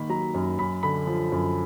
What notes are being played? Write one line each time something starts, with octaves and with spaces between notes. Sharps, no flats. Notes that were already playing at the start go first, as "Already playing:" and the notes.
Already playing: D#3 A#3 B5
F#3 A#5
F#2
F#2 B5
D3 B5
F3
F#2